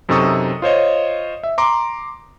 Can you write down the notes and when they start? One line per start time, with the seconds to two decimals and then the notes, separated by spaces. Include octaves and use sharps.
0.09 F#2 C3 D#4 A4 C#6 D#6
0.62 F4 C5 C#5 D#5
1.44 E5
1.58 A#5 C6 D6